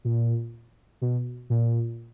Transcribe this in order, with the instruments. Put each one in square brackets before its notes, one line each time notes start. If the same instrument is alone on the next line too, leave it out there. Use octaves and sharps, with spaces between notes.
[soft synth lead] A#2
B2
A#2